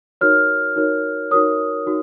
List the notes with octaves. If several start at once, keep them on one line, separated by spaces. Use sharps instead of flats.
D#4 F#4 A#4 C#5 F6
D#4 F#4 A#4 C#5
D#4 F#4 A#4 C#5 D#6
D#4 F#4